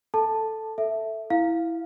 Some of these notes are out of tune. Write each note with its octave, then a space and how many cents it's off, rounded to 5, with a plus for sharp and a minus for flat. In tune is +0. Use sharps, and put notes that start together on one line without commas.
A4 +0 A5 +0
A4 +0 E5 +0
E4 +0 F5 +0